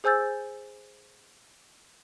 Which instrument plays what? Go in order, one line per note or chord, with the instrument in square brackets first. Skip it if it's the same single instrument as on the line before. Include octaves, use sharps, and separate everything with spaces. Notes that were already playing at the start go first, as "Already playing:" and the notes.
[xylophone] G#4 C5 G#5 E6 G6 A6